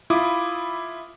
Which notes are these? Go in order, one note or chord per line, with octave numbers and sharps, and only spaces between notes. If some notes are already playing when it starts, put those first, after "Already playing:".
E4 F4 B5 D6 D#6